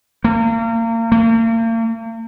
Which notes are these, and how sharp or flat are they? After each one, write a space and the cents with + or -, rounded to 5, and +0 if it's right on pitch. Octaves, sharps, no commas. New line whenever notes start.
A#3 -35
A#3 -40